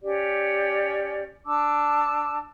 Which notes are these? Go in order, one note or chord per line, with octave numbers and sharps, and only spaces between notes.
C#4 G4 D5
D4 A5 D6 E6